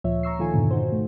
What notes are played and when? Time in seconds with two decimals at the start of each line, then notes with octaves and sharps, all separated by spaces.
0.04 D2 A#2 F3 C#5 E5
0.23 A#5 C#6 E6 C7
0.39 A#2 D#3 F3 F4 A4 G#5
0.53 F2 G#2 B2 D3 D#3
0.71 D#4 F#4 C5
0.92 A3